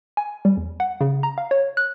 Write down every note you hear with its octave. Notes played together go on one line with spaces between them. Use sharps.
G#5
G3
E2
F#5
C#3
A#5
F5
C#5
F#6